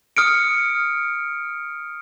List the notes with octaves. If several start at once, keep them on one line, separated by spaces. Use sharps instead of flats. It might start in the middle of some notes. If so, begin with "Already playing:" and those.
D#6 F6 C#7 D7